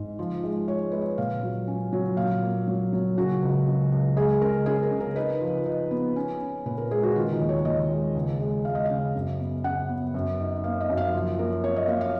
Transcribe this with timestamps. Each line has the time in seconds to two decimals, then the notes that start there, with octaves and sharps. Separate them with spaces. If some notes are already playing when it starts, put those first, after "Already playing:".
Already playing: G#2
0.19 F3
0.44 G#3
0.68 G#3 C#5
0.92 G#3 B4
1.01 C#5
1.18 A#2 F5
1.43 F#3
1.67 C#4
1.93 F#3
2.17 A#2 F5
2.42 A#3
2.67 F#3
2.93 F#3
3.18 C#3 F#4
3.43 C#2
3.67 C#2
3.92 C#2
4.16 G#3 G#4
4.41 C#3 A#4
4.66 C#4 G#4
4.83 A#4
4.91 C#3
5.00 A#4
5.16 D#4 B4
5.41 F3
5.66 D#4
5.91 B3
6.16 C#4
6.41 C#4
6.66 A#2 B4
6.78 A#4
6.91 G#3 G#4
7.03 F#4
7.16 D#3 F4
7.32 D#4
7.41 D#2
7.49 C#5
7.65 D#2 D#5
7.90 G#3
8.15 C#2
8.40 G#3
8.65 G#3 F5
8.75 D#5
8.85 C#3 F5
9.15 F#2
9.40 B3
9.64 C#3 F#5
9.89 B3
10.14 F#2
10.39 D#4
10.64 A#3 F5
10.81 D#5
10.89 F#2
10.97 F5
11.14 F3
11.39 A#3 A#4
11.64 A#3 C#5
11.76 D#5
11.88 A#3 F5
12.01 F5